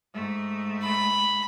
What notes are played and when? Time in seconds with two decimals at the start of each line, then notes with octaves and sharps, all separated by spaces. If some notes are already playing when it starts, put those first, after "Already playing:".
0.14 G#2 A3
0.84 B5